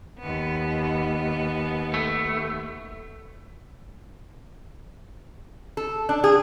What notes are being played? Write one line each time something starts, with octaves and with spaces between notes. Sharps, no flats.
D#2 B3
A3
A4
D4
G#4